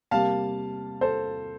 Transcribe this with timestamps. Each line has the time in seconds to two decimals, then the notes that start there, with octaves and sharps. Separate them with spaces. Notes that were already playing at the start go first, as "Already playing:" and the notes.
0.11 C3 G3 A#3 F5 A5
1.01 A4 C5